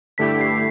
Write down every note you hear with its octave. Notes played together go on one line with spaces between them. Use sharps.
G2 D3 A3 E4 G4 B6
C7